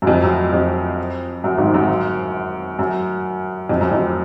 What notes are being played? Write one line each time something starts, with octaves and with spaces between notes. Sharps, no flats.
F#2
F2
F#2
F2
F#2
G#1 G#2
F#2
F#2
F2
F#2
F2